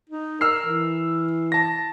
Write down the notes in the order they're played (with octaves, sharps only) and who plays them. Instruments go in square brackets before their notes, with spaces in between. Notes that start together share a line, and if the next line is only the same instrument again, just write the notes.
[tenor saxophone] D#4
[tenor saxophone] A#4 [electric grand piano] E6 F6 C7
[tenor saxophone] E3
[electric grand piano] A5 A#6